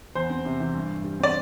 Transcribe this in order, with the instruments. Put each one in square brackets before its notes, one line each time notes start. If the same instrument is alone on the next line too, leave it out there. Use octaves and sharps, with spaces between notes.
[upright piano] E2 [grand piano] C5
[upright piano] C4
C3
E3
G2
G2
G3
[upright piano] C4 [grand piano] D5